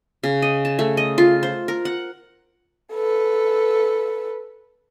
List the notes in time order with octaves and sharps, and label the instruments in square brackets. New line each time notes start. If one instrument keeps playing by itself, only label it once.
[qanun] C#3
D#5
A5
A3
D#5
F4
C5
A#4
F#5
[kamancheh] A4 B4